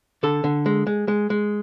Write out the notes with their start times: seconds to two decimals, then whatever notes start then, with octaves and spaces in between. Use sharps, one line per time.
0.23 D3 A4
0.44 D3
0.66 G#3
0.87 G#3
1.08 G#3
1.30 G#3